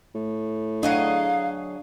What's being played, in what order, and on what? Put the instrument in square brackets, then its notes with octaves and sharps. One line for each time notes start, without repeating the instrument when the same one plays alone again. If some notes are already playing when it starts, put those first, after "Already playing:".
[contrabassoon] A2
[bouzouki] F#3 G#4 D#5 [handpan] D4 [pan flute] F5